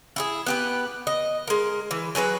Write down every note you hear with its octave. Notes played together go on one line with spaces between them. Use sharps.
E4 G4 G#4
B3 G4 B4
D#5
G#3 A#4
E3
F#3 G#4 A4 B4